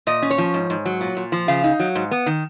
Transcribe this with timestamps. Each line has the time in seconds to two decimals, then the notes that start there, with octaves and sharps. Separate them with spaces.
0.07 A#2 D#5
0.22 C#4
0.30 C#5
0.38 F3
0.54 G#2
0.70 G#2
0.85 F#3
1.01 A#2
1.17 A#2
1.32 F3
1.48 C#3 F5
1.64 D#4
1.80 F#3
1.95 G#2
2.11 B3
2.26 D#3